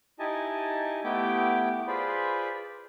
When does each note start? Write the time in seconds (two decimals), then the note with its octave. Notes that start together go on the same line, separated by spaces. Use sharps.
0.19 D#4 E4 G4 D#5 G#5 A5
1.04 A3 B3 E4 G4 G5 D6
1.87 F4 G#4 B4 C5 D5 B5